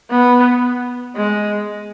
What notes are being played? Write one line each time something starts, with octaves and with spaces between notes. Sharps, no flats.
B3
G#3